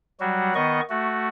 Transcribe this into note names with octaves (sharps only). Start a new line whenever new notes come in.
F#3 G3 F#4
D#3 B3 D#5 C#6
A3 F#4